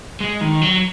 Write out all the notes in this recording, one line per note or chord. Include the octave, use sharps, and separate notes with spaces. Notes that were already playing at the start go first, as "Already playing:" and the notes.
G#3
D#3
F#3